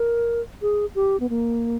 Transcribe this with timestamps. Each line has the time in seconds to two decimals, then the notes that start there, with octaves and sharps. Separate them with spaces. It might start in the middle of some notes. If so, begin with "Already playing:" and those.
Already playing: A#4
0.62 G#4
0.95 G4
1.20 B3
1.29 A#3